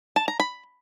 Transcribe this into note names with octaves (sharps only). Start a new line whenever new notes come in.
A5
A#5
B5